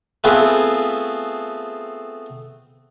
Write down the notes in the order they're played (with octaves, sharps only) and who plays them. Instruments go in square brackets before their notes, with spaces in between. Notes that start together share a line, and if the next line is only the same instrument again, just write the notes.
[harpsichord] A3 B3 C4 F4 G#4 B4